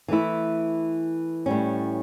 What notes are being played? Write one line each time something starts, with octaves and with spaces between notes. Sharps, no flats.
E3 A3 E4
A2 G3 C#4